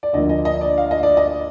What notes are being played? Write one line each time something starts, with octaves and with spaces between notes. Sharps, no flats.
D5
D2 D3 F3 A#3 D#5
D#5
D#5
D5
F5
D#5
D5
D#5